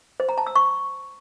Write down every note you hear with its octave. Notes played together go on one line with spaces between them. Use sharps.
C5
A#5
A5
E6
C#6